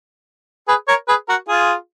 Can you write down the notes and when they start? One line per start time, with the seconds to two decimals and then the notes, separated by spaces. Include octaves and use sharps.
0.68 G#4 B4
0.88 A#4 C#5
1.08 G#4 B4
1.29 F#4 A#4
1.48 F4 G#4